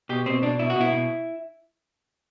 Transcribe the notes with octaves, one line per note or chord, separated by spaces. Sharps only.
B2 G4
B2 C4
B2 D4
B2 E4
F#4
B2 E4
B2